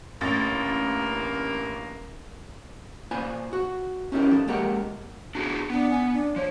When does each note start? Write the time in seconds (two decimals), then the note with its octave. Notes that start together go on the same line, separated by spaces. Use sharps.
0.21 A1 G2 E3 A#3 A6
3.11 A#2 F4 C5 G#5 B5
3.53 F#4
4.12 C#4 D#4 E4 G4 A#4
4.31 F3 A4
4.48 G#3 A#3 G4 A#4 F#5
5.35 D4 F#4 G#4
5.70 B3 D4
5.91 G#5
6.13 D4
6.36 F3 C#5